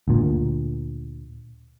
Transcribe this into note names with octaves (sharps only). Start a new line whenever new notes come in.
D2 A#2